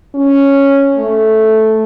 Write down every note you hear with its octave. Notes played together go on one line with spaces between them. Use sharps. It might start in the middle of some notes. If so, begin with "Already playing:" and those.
C#4
A3